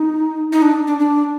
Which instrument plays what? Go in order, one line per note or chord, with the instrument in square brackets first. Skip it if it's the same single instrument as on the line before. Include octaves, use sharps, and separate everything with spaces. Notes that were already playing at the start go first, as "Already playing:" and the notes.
Already playing: [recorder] D#4
D#4
D4
D4
D4